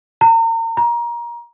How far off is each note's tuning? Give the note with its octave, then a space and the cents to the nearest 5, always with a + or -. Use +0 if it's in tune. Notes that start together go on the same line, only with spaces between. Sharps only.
A#5 -35
A#5 +25